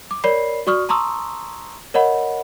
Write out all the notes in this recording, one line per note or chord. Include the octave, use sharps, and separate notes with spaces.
D6
A#4 C#5 D5 B5 C7
F#4 D5 C#6 D#6 F6
A5 A#5 C6 C#6 D#6 E6
A#4 C#5 D#5 F#5 B5